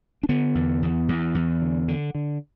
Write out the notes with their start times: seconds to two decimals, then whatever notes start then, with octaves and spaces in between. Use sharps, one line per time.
0.23 D4
0.29 D3 B3
0.55 E2
0.82 E2
1.08 E2
1.35 E2
1.62 D3
1.88 D3
2.15 D3